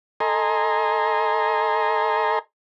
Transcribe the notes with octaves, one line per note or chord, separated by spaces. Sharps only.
A4 D#5 G#5 A#5 C6